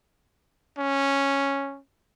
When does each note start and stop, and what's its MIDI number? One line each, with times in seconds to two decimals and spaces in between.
0.78 1.80 61